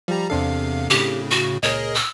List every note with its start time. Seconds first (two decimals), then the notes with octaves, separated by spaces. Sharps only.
0.08 F3 G3 G4 A#5
0.30 E2 C3 C4 D4 A4 F5
0.90 A2 C#3 G4
1.31 F#4
1.63 C#2 A#2 G#4 A#4 C#5 D#5
1.95 E6